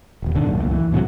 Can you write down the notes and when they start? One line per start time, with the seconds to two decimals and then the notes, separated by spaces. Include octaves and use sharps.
0.22 D#1 D#2
0.35 G#2 B2 D3 D#3
0.46 F#2 A#2
0.58 C#2 A3 A#3
0.71 E3
0.92 A2 C3 E3 F#3